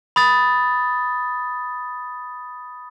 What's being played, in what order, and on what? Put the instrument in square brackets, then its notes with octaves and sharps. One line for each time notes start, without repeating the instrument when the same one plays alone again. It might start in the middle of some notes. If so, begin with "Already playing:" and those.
[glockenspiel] B5 D#6 A6